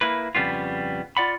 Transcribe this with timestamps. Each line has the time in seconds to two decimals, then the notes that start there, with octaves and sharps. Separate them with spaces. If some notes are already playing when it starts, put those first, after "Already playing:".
0.01 A#3 E4 B4
0.35 F2 C#3 G3 B3 F4
1.17 F4 D5 F#5 B5